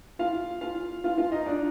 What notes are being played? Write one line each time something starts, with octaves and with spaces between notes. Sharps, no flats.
F4 F5
F4 F5
F4 F5
F4 F5
D#4 D#5
D4 D5